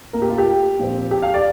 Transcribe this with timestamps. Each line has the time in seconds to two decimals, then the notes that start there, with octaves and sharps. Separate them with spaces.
0.13 A#2 A#3 A#4
0.22 G4
0.30 F4
0.38 G4
0.79 A#2 F3 C4
1.11 G4
1.22 F5
1.34 D5